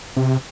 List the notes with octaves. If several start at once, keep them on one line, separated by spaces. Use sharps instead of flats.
C3